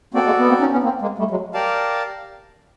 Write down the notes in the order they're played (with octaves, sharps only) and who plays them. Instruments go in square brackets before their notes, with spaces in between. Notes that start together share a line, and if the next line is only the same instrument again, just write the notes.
[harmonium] A#3 C4 [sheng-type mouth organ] F#4 A4 D5
[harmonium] G#3 A#3
B3
A#3 C4
C#4 D#4
B3 C#4
A#3 C4
G#3 A#3
G3 A3
F#3 G#3
[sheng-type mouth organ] G4 A#4 D5 F5 A5